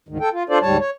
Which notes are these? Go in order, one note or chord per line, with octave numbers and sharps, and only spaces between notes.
D2 G#2 D#3
A4 G5
F4
D4 F4 A4 C5 D5
D2 G#2 G3 C#5 A5
C#5